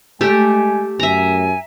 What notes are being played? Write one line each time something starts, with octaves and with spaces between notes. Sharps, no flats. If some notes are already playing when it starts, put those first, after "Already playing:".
G#3 A3 G4 A4 G#5
F#2 E5 G#5 A#5